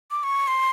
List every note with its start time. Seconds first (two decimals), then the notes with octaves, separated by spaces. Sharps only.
0.11 D6
0.23 C#6
0.48 C6